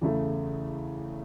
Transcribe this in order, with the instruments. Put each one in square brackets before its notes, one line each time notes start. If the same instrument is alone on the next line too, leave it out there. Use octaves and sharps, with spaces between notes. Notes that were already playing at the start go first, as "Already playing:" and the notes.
[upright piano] E2 C#3 E3 A3